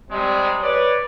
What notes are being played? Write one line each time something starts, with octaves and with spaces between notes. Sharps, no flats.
C3 G3 G#3
B4 C#5 D5